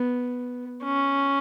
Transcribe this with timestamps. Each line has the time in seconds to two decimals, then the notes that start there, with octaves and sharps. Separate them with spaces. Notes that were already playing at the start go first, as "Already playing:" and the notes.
Already playing: B3
0.84 C#4